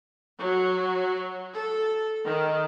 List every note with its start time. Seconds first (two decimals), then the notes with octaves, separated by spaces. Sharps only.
0.38 F#3
1.53 A4
2.26 D#3